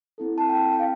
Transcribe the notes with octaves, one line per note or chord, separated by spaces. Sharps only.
C4 E4 A4
A5
G5
G5
F5